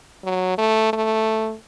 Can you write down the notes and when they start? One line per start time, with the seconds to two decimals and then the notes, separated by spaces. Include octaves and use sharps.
0.24 F#3
0.58 A3
0.93 A3